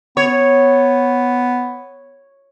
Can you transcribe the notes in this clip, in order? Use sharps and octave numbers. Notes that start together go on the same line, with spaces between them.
B3 C#5